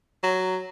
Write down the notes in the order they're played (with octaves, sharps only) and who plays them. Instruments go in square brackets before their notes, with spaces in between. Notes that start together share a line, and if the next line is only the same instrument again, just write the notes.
[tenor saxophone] F#3